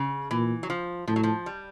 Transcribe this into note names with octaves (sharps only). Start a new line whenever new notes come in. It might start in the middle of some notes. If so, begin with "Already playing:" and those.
Already playing: C#3
A#2 E3
F#3
F3
A2 F3
F#3
F3
G3